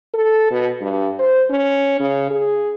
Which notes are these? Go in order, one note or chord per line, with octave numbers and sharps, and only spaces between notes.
A4
B2
G2
C5
C#4
C#3
G#4